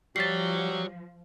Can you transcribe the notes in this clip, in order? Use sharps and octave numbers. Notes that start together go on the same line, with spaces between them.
F3 G3 F#4 C#5 A6 B6 C7